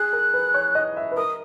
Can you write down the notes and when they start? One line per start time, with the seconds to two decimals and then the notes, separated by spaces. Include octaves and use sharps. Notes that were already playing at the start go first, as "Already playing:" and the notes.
Already playing: G#4 F#6
0.13 A#4
0.34 B4
0.54 C#5
0.75 D#5
0.97 E5
1.11 B4
1.17 A#4 D#6